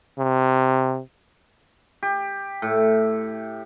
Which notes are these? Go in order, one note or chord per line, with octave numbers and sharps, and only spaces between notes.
C3
G4
A2